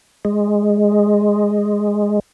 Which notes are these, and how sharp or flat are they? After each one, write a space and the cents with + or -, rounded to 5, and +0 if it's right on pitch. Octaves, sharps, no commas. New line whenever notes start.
G#3 -5